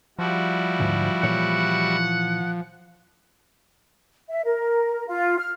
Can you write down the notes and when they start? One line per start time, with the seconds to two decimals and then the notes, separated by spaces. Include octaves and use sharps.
0.19 F3 G3 E4 F#4
0.80 D2 G#2
1.23 A#2 E3 C#5 F#5
4.29 E5
4.45 A#4
5.07 F4
5.39 F6